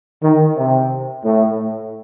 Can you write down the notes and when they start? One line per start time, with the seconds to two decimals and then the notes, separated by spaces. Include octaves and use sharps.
0.22 D#3
0.56 C3
1.23 A2